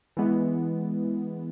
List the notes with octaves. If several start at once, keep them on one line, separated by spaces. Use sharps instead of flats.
E3 G#3 B3